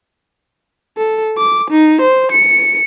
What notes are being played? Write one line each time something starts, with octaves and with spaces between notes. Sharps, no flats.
A4
D6
D#4
C5
C#7